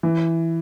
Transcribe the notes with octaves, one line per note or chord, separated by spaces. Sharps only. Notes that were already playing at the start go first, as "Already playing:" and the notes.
E3